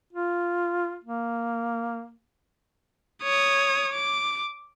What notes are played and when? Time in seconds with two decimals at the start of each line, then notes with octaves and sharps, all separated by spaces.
0.13 F4
1.04 A#3
3.23 C#5 D#6
3.93 D6